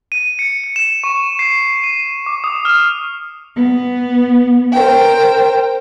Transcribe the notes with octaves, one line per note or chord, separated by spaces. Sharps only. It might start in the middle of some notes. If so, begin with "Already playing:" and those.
D#7
C#7
C#7
E7
C#6
C7
D#7
D6
D#6
F6
B3
A#4 C5 G5